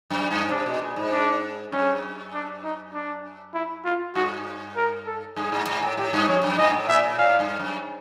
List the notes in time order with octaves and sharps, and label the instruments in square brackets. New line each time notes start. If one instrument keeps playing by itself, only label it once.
[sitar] F#2
G2
[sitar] C3 [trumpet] D4
[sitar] B2
A#2
G#2
[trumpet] D4
[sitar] F#2 [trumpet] C#4
[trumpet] D4
D#4
D4
E4
F4
[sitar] G2 [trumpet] F#4
[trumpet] A#4
A4
[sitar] G2 [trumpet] G#4
[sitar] G#2
G#2
A2
[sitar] A2 [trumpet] G4
[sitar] G2
[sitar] F2 [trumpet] C#5
[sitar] F#2
[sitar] G#2 [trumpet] D#5
[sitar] A2
[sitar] A#2 [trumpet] E5
[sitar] A#2
[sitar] A2 [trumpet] F5
[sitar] G2
F#2